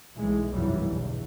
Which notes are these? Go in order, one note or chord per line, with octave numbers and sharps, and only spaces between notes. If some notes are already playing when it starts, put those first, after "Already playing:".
B1 E3 G#3
F1 B1 G2 E3 F#3 G3
G1 E2 B2